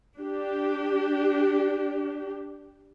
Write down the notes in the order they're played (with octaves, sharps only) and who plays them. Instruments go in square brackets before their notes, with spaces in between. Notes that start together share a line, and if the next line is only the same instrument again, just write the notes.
[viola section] D4 G4